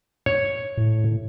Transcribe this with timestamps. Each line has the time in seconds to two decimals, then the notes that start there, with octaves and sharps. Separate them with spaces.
0.26 C#5
0.77 A2